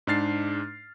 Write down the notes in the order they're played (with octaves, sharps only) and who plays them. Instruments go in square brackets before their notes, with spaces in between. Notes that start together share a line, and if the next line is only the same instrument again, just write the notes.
[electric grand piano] G#2 G#3 D4 F6 A6 C7